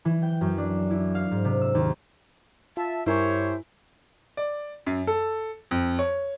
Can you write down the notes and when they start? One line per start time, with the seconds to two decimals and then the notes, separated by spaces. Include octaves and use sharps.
0.05 E3
0.22 G5
0.41 F#2
0.58 D4
0.90 E4
1.15 F5
1.31 G#2
1.44 C3
1.61 E6
1.75 D#2
2.77 F4 E5 A5
3.06 G2 E4 G4 A#4 C5 C#5 G#5
4.37 D5
4.86 F#2
5.07 A4
5.71 F2
5.99 C#5